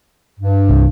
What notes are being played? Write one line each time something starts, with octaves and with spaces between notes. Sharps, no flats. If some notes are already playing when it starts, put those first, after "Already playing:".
G2
C2